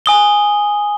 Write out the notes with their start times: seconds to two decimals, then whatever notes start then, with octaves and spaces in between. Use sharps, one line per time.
0.06 G#5 D#6 G7